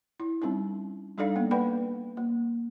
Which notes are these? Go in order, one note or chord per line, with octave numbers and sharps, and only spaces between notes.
E4
G3 C4 C#4 D#4
G3 D4 D#4 A4 D5 F5
A#3 B3
B4 D5 F#5 G5 B5
A#3